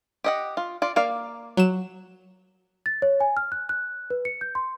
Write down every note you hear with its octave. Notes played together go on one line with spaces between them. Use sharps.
G4 D#5 F#5
F4
F4 D5
A#3 D5 F5
F#3 E7
A6
C#5
G#5
F6
F#6
F#6
B4
C#7
G6
C6